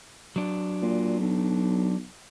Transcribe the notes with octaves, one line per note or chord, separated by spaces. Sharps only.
F#3 D4
A#2
B1